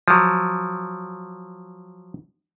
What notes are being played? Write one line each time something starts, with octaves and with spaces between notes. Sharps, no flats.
F3 F#3